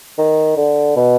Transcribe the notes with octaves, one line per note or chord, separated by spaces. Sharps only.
D#3
D3
B2